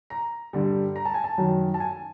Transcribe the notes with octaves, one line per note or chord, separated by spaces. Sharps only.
A#5
G2 D3 G3
A#5
A5
G#5
A5
F#2 D#3 F#3
A5
G#5